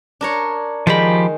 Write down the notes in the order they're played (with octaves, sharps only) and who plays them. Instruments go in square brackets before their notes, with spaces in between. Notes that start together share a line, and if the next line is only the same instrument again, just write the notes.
[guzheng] D4 A#4 C#5
[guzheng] D#3 G#3 [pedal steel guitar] F3 G4 B5